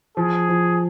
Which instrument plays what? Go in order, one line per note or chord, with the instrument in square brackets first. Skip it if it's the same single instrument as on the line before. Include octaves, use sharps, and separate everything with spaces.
[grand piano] F3 [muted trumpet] G#4
[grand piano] F3